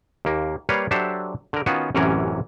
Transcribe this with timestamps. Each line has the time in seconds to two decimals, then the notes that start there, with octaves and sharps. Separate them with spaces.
0.25 D#2 A#3
0.69 G3 A#3 B4 C#5 F5
0.91 F#3 D4 G4 A4 C5 E5
1.53 D3 A#4
1.66 D#3 B3 C#4 F4 F#4
1.95 A1 F#2 C3 E3 C#4 A#4